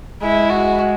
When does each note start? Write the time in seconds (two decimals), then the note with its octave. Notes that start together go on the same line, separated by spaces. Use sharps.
0.22 G#3 E4
0.50 F#4